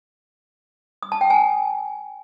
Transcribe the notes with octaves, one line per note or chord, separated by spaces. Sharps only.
D#6
A5
G5
G#5